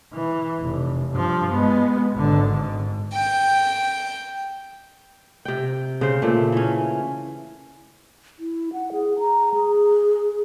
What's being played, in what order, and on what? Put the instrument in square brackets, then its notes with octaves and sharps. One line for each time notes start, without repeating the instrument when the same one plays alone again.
[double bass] E3
F1
G2 F3
G#3 B3
G#1 D3
G#2
[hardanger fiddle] G5
[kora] C3 G5
C#3 C5
A#2 A3
E3 C#4
[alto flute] E4
F#5
G#4
A#5
G#4